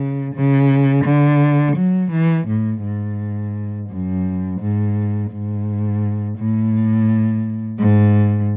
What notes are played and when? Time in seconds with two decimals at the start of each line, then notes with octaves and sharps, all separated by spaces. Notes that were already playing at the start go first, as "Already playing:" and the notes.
Already playing: C#3
0.34 C#3
1.05 D3
1.76 F#3
2.12 E3
2.48 A2
2.83 G#2
3.89 F#2
4.60 G#2
5.31 G#2
6.38 A2
7.79 G#2